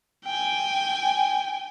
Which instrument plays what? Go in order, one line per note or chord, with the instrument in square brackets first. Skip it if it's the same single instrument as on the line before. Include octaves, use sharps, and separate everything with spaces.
[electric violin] G5 G#5